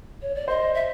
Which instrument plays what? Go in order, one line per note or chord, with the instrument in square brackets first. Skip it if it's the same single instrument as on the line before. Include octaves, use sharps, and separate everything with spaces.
[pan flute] C#5
D5
[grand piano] C5 [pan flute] D#5
[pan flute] E5